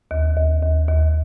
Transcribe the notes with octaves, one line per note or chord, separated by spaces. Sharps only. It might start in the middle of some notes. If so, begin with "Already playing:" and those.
D#2
D#2
D#2
D#2